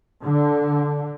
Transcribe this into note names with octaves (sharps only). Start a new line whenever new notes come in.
D3